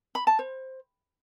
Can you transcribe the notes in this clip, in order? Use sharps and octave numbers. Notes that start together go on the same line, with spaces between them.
B5
A5
C5